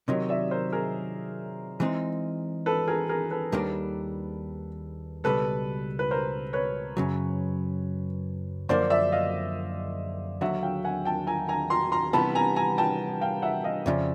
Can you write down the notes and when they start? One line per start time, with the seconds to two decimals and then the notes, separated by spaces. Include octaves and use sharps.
0.08 C3 D#3 F#3 C#5 D#5
0.29 D5 E5
0.51 A#4 C5
0.73 G#4 A#4
1.80 E3 G#3 C4 D#4
2.66 A4 B4
2.88 G#4 A#4
3.09 G#4 A#4
3.31 A4 B4
3.52 D#2 D#3 G3 A#3 D4
5.24 C#2 B2 G3 A4 B4
5.99 B4
6.11 A#4 C5
6.53 B4 C#5
6.97 F#2 C#3 F#3
8.69 F#2 D3 F3 A#3 C5 D5
8.90 D5 E5
9.12 D#5 F5
10.41 D#2 D3 F#3 E5 F#5
10.63 F5 G5
10.85 F#5 G#5
11.05 G5 A5
11.27 G#5 A#5
11.49 G#5 A#5
11.70 A#5 C6
11.92 A#5 C6
12.13 C3 E3 G3 B3 A5 B5
12.35 G#5 A#5
12.56 G#5 A#5
12.78 G5 A5
13.21 F5 G5
13.42 E5 F#5
13.64 D#5 F5
13.86 F2 C#3 F3 D5 E5